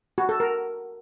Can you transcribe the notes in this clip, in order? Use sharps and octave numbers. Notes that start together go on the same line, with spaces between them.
F#4
A4
A#4